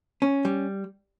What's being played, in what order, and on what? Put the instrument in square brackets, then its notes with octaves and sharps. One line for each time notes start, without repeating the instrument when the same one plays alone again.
[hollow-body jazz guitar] C#4
G3